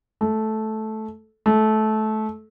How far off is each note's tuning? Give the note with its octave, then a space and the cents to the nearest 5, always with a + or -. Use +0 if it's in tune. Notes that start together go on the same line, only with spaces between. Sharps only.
A3 -10
A3 -20